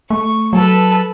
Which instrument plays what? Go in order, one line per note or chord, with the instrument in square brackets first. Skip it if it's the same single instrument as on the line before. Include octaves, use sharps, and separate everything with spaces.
[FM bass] A3 [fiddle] C#6
[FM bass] F#3 [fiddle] A4 B4